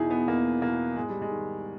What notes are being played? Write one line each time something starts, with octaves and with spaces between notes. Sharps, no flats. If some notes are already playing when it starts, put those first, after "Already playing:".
Already playing: E2 B2 D#4 E4 G#4
B3
E2 A#3
B2 A#3
G#2 G#3
G3
G#3
D#3